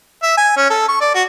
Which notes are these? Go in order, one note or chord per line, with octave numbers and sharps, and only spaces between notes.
E5
G#5
C#4
A4
C#6
D5
F#4